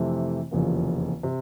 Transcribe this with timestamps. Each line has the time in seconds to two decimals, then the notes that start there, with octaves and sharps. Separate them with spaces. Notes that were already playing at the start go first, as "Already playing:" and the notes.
Already playing: F2 C3 E3 A3 C4
0.51 F1 E2 C#3 F3 A#3
1.23 C3